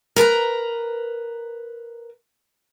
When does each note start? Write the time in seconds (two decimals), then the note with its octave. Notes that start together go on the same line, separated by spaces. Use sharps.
0.16 A#4 B4 A5 A#5